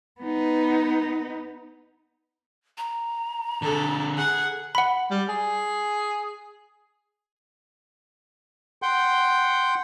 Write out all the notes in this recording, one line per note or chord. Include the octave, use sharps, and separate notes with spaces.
B3 D#4
A#5
D3 G#4 A4
G#4 F#5
F#5 B5
G3
G#4
F#5 G5 C6 G6